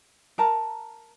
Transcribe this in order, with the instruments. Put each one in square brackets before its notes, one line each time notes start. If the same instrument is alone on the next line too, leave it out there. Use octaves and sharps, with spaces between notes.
[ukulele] A#4 A5 A#5